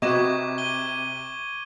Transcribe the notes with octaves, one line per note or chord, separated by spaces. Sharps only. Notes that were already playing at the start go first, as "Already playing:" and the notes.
C3 F#4 B4 D#5 C#6 D6 G#6 E7
D#7 G7